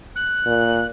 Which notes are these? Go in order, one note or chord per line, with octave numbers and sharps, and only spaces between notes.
F#6
A#2